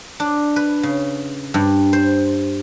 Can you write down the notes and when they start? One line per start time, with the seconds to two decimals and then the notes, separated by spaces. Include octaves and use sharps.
0.20 D4
0.56 B4
0.83 C#3
1.54 G2
1.93 C5